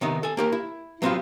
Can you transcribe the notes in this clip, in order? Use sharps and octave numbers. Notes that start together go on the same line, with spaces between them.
C3 D#3 B3 D#4
A4 G#5
A#3 G4 A#4
E4
F#3 B3 C4 D4 F4 G4